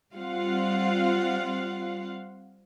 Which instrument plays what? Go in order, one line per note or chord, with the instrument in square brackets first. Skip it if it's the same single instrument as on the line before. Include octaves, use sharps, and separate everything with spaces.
[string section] G3 C4 F4 F5 F#5